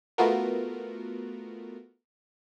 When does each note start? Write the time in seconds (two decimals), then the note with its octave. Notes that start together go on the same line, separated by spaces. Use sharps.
0.18 A3 B3 F4 F#4 A#4